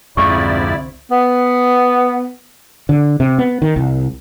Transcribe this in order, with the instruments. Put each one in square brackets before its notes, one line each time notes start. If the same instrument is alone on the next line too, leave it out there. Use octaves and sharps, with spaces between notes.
[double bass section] C2 D3 C4 [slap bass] F2 G#2 [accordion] E4 D5 [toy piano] C#6
[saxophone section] B3
[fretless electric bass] D3
C3
B3
D#3
C2